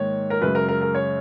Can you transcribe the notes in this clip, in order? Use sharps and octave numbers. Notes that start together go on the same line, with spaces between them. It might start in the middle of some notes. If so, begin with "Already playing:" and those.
Already playing: G#2 D#3 A#3 C#5
A#4
F#2 C#3 G#3 B4
A#4
A#4
A#4
C#5